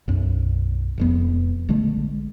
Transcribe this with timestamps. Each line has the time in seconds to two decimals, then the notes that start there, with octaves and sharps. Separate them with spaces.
0.08 B1 F#2
0.98 E1 F2 B3
1.69 A#1 D3 G#3 A3